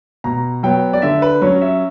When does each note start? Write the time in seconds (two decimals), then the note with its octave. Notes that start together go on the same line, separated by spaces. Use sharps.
0.24 B2 A#5
0.63 F#3 B3 G5
0.93 D5
1.02 D3 E5
1.22 B4
1.41 F#3 C#4 C#5
1.61 E5